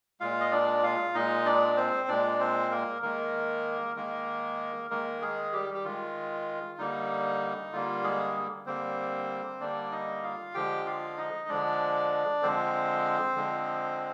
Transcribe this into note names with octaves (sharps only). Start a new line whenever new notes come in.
A#2 G#3 F4 F5
D#5
D4 D5
F4 F5
A#2 G#3 D#4 D#5
D4 D5
C4 C5
A#2 G#3 D4 D5
C4 C5
A#3 A#4
D#3 G#3 A#3 A#4
D#3 G#3 A#3 A#4
D#3 G#3 A#3 A#4
G#3 G#4
G3 G4
G4
D#3 G#3 F4
D3 G3 A#3 D#4
D3 G3 A#3 F4
G#3 G#4
D3 G3 A#3 C4 C5
D3 G3 A#3 D4 D5
D#4 D#5
F4 F5
D3 F3 G#3 G4 G5
F4 F5
D#4 D#5
D3 F3 G#3 D4 D5
D3 F3 G#3 C4 C5
D3 F3 G#3